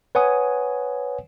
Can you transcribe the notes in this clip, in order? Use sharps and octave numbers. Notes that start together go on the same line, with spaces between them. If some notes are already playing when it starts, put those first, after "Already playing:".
B4 C#5 F#5 G#5 D#6